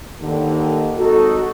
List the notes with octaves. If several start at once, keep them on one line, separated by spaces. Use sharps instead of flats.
D#2 D3 D#3
G#1 D#4 F#4 A4